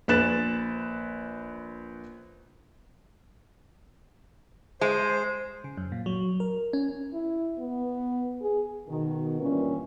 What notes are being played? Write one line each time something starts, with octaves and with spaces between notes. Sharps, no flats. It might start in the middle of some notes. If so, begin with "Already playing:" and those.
A#1 B4 F#6 A6 E7
G#3 C5
C#3
F#2
A#2
F#3
A#4
C#4
E4
B3
G#4
B2 D#3
G2 A#2 E3 C#4